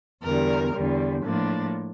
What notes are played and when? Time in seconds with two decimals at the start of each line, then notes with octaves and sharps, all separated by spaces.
0.23 E2 D3 G3 A#4
0.74 E2 D3 G3
1.24 A2 F3 A#3 D4